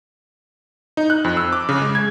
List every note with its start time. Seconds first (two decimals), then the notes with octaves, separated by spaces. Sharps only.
0.97 D#4
1.10 F#6
1.24 F2
1.37 E6
1.52 D6
1.69 C#3
1.82 G#3
1.95 G#6